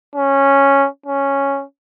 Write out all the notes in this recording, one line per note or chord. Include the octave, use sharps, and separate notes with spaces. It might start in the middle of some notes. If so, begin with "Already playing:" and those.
C#4
C#4